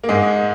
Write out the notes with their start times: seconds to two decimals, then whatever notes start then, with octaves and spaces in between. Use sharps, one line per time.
0.03 A#3
0.09 G#2 G#3